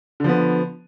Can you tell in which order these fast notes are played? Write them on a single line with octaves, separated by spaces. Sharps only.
D3 F3 B3